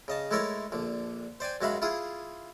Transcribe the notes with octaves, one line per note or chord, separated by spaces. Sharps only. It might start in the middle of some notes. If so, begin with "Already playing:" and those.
C#3 D#5 A5
G#3 A3 E4 A4 A#4 C#5
A#1 D3
C5 D5 G5 G#5
F#2 G#3 F#4 E5 F5 B5
E4 F4 G#4 D#6